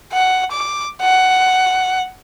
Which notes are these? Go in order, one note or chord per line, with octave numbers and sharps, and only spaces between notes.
F#5
D6
F#5